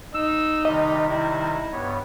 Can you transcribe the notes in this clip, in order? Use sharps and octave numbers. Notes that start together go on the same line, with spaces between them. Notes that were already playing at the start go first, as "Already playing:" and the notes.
D#4 E6
C3 D#3 G3 G4 D#5
D#4 E4
G2 B3 C#5